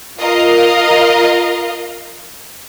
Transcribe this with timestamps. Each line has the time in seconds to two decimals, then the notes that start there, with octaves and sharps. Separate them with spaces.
0.20 F4 A#4 D#5 F5